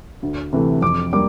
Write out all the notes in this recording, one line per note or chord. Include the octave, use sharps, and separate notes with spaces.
D2
C3 E3 A3
F2 D6
G3 A#3 D6